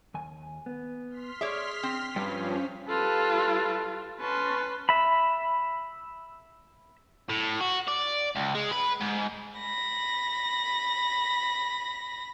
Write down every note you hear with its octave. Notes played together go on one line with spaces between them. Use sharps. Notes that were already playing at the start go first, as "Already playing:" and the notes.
D#2 G#5
B3
C6 F6 B6
G#4 C#5 D5 E5
C4
G2 F3 C#4 G5
G3 F4 A4 B4
C#4 B4 A5 C6
E5 B5
A2
F#4
D5
C#2
G#3
B4
G#2
B5 A#6